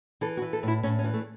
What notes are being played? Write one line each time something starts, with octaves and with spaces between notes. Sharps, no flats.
E3 A4
F#4
E3
A4
A2 E4
A2 C#4
C#4
E3
A3